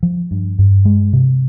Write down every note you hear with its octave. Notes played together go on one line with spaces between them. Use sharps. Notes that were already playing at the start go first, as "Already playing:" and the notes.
F3
G2
G2
G#3
C3